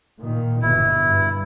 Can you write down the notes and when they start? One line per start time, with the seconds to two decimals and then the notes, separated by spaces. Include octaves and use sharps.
0.19 A#2 D#3
0.62 G1 B2 E4
1.06 G2